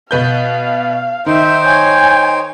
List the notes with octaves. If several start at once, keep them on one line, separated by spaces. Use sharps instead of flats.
B2 B4 F5 G6
D#3 D#4 C5 E5 G5
C#5 G#5